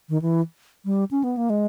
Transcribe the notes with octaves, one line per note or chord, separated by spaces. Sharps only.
D#3
E3
G3
C#4
B3
A#3
G#3